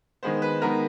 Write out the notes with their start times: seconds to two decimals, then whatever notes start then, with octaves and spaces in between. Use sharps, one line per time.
0.23 D#3 G#3 B3 C5
0.42 B4
0.61 D#3 G#3 B3 A#4